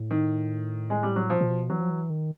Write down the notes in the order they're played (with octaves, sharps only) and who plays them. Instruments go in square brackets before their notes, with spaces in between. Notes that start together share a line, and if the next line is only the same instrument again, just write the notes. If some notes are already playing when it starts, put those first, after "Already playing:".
Already playing: [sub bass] A2
[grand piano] D#3
G#3
G3
F#3
[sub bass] A#2 [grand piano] F3
[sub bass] A#2
B2
[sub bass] E3 [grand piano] F#3
[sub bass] F3
E3
D#3